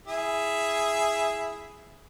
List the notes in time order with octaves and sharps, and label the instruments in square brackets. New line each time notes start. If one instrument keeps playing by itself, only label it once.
[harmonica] E4 G#4 E5